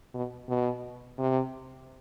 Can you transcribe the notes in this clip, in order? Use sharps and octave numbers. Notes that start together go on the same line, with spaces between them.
B2
B2
C3